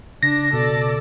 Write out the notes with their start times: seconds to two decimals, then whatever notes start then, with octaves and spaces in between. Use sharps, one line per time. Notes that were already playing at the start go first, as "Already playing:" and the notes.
0.23 C#3 D4 A#6
0.53 B2 A4 D5